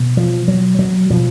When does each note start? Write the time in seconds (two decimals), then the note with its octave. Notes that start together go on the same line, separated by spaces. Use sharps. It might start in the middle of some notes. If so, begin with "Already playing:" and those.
Already playing: B2
0.17 F3
0.48 F#3
0.79 F#3
1.10 B2 F3